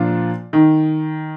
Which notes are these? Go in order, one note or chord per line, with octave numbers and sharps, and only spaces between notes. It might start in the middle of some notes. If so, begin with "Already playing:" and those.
Already playing: A#2 F3 D4 F4
D#3